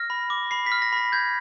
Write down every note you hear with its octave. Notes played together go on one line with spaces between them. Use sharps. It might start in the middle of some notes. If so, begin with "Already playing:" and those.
Already playing: F6 A#6
B5
D6
B5 C7
B6
F6
A#6
B5 A#6
G6 G#6